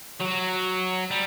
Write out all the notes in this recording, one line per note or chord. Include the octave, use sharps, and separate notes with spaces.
F#3
G3